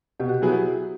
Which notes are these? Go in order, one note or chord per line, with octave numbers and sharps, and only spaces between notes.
B2 G4
F#4
G4
F#3 B3 E4 G#4